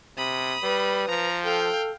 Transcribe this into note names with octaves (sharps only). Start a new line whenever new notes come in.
C3 B5 D#6
G3 B4
F3 A#5
A4 F5 G5